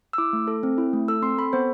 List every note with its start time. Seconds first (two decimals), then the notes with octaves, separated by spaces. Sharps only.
0.13 E6
0.18 E4 D6
0.33 A3
0.48 A4
0.63 C4
0.78 E4
0.93 A3
1.08 A4 E6
1.22 C4 C6
1.38 A4 B5
1.53 B3 C5